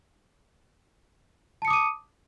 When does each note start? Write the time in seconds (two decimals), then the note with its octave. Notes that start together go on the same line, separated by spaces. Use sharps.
1.62 A5
1.65 C#7
1.68 D#6
1.70 D6
1.73 D#7